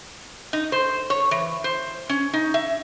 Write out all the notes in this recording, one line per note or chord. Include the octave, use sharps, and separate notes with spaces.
D#4
C5
C#5
E3
C5
C#4
D#4
E5